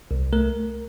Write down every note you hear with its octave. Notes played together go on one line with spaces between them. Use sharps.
C2
A3 A#4